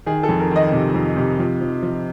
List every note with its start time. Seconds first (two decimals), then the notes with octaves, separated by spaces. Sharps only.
0.06 D#3 G#4
0.23 A4
0.29 F2
0.39 A#4
0.51 D#3 D#5
0.72 C3
0.94 F2
1.17 C3
1.39 F3
1.61 F3
1.82 F3